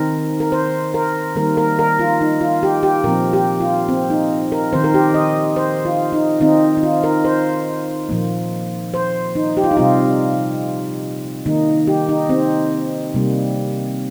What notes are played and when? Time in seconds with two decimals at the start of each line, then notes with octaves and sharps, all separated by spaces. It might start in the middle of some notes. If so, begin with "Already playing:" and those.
Already playing: D#3 C4 A#4
0.40 A#4
0.52 C5
0.94 A#4
1.36 D#3 G3 A#3 A#4
1.57 A#4
1.79 A#4
1.99 F4
2.21 D#4
2.41 F4
2.63 G4
2.83 G4
3.04 A#2 F3 C4 A#4
3.33 G4
3.60 F4
3.88 C4
4.10 D#4
4.52 A#4
4.73 D#3 C4 C5
4.84 A#4
4.94 G4
5.14 D#5
5.56 C5
5.85 F4
6.12 D#4
6.40 D#3 C4 D#4
6.77 D#4
6.83 F4
7.04 A#4
7.25 C5
8.09 A#2 F3 A#3
8.94 C5
9.36 D#4
9.57 G4
9.64 F4
9.71 D#4
9.77 C3 G3 C4 F4
11.46 D#3 A#3 D#4
11.87 G4
12.09 D#4
12.29 C4
13.14 C3 G3 A#3